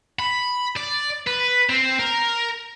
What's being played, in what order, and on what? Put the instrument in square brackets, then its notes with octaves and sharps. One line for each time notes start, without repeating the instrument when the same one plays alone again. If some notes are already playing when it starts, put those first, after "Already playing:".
[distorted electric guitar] B5
D5
B4
C4
A#4